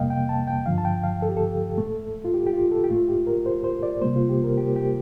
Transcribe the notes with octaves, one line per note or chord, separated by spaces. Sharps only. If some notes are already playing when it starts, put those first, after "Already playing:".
Already playing: F2 C3 G3 A#3 D#5 F5 G5
G5
A5
G5
G2 D3 F3 F5
A5
G5
F5
A4
G4
A4
A2 A3
F4
G4
G4
F4
A4
G4
A2 A3 F4
G4
A#4
C5
C5
D5
C3 G3 A#3 C5
F4
G4
A#4
G4
G4